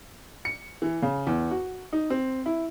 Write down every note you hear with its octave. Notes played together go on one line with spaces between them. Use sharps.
C#7
E3
C#3
E2
F#4
D#4
C4
E4